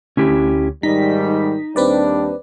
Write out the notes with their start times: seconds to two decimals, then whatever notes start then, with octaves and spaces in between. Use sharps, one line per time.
0.17 D2 C#4 E4 G4
0.83 G#2 D#3 G3 D#4 B6
1.76 D#2 G3 C4 D4 B4 D5